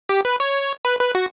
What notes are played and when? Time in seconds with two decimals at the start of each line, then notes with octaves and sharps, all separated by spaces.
0.09 G4
0.25 B4
0.40 C#5
0.85 B4
1.00 B4
1.15 F#4